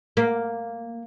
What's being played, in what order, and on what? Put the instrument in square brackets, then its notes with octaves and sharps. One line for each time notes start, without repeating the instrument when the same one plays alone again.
[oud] A#3